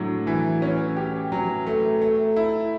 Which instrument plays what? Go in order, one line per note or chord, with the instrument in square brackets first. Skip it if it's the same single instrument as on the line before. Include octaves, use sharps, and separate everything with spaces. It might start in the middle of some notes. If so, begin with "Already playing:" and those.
Already playing: [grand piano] A2 D4 [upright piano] F#3
[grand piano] E3
C#4
G4
F#3
A3
A3
E4